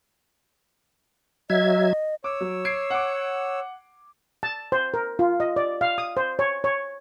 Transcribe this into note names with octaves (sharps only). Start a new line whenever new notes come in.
F#3 D#5 E5 G#6
C#5 D6 E6
F#3
G#6 C7 D7
F#5 D6
A5
C5
A#4
F4
D#5
D5
F5
D#6
C5
C#5
C#5